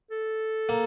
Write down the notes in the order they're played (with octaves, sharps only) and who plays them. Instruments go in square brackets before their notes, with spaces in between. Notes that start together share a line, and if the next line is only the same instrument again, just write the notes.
[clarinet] A4
[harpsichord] A#3